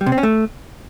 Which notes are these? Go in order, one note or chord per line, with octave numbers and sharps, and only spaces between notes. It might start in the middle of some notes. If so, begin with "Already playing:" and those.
G3
C3
C4
C#4
A3